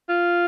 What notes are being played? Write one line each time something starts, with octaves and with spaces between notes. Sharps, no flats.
F4